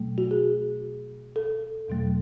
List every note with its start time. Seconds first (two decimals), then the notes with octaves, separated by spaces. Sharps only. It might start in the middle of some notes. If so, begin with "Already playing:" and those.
Already playing: B2 F#3 A3
0.18 F#4
0.31 G#4
1.36 A4
1.88 E2 B2 F#3 A3